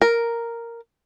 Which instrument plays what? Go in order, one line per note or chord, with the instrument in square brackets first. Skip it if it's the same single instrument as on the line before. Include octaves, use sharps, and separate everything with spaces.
[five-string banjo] A#4